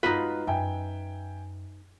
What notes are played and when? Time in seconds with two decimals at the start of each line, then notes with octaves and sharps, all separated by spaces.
0.03 G2 G#3 D#4 F4 F#4 B4
0.47 F#2 E5 G5 G#5